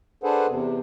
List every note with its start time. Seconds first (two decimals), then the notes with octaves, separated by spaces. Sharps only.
0.24 D4 G#4 A4 B4 C5 F#5
0.48 E2 C3